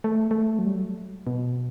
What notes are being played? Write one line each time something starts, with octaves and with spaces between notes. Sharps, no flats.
A3
A3
F#3
G3
F#3
B2